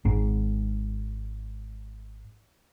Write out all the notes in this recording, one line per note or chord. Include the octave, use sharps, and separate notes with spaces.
G#1 G#2